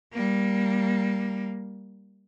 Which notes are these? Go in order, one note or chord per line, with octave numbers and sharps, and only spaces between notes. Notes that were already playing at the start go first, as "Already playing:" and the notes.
G3 A#3